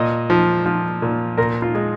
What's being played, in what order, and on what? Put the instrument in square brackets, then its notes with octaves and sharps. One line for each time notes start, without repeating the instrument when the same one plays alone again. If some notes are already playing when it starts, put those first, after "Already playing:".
Already playing: [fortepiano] A#2 D#5
F3
F3
A#2
A#2 A#4
F4
G#3